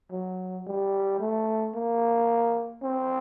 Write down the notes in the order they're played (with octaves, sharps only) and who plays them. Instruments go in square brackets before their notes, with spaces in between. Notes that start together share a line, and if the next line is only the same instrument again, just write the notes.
[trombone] F#3
G3
A3
A#3
C4